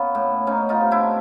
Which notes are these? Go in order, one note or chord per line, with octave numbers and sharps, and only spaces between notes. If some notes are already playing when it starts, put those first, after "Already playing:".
Already playing: A#3 B3 C#4
A2
B3 C#4 D#4
D#4 F4
C3
D4 E4